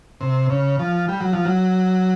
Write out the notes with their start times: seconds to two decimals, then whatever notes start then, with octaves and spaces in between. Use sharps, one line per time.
0.21 C3
0.50 C#3
0.79 F3
1.08 G3
1.20 F#3
1.33 F3
1.45 F#3